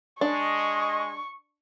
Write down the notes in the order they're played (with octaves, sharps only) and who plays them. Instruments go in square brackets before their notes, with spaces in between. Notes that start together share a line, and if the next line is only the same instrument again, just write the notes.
[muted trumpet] G#3 [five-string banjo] D4 [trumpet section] D#5 [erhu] C#6